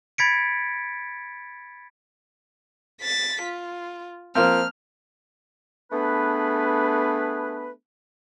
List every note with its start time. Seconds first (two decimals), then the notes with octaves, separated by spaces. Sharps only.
0.18 B5 G#6 A6 B6 C#7 D7
3.02 A6 B6
3.42 F4
4.35 F3 A#3 C4 F6
5.92 A3 B3 D4 G#4 B4